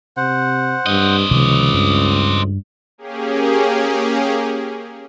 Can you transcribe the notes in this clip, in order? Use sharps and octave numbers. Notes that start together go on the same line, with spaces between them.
C3 C5 F#5
G2 C4 D#5
C#2 C3 D#3 F3 D6 D#6
G2
A#3 C#4 G4 G#4